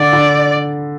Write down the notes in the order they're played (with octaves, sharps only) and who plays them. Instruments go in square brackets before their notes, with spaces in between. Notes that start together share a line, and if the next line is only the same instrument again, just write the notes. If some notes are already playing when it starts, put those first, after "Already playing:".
Already playing: [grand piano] D3 [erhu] D5
[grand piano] D3